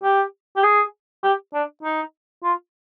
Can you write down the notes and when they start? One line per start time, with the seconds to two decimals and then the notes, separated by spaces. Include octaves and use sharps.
0.03 G4
0.56 G4
0.63 G#4
1.23 G4
1.54 D4
1.83 D#4
2.43 F4